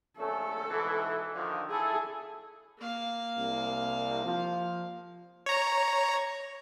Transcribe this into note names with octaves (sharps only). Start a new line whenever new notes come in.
A#1 A3 C#4 A4
G#2 B2 E3
D3 D#3 F3
E4 G#4 A4
A#3 F5
C2
F3
C#5 A#5